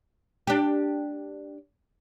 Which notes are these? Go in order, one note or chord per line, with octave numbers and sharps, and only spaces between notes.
D4 G4